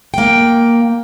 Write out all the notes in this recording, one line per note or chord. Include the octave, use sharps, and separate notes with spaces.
A#3 G5